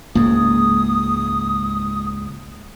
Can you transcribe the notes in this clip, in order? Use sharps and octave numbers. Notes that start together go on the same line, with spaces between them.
C#2 G#2 A#3 D#6